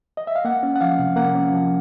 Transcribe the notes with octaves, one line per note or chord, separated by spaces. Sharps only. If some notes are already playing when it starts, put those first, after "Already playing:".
D#5
E5
F5
A#3 F#5
C#4
F#5
F3 F5
C3
A#3 F#5
C#4
F3